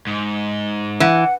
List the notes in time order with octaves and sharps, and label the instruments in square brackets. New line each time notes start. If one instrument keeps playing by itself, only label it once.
[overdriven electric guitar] G#2
[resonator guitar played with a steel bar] E3 [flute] F#5